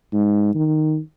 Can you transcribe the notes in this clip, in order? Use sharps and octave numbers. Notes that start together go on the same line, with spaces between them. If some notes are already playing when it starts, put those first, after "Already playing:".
G#2
D#3